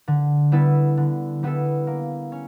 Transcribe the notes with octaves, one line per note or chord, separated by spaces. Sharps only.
D3
G3 B3 E4 A4
D3
G3 B3 E4 A4
A#3
C#4